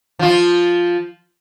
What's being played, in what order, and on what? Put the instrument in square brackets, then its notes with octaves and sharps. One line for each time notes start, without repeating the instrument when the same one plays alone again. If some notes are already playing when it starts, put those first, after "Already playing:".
[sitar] F3 F4